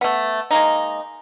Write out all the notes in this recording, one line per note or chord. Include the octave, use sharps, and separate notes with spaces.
A3 B3
G#3 A#3 D#4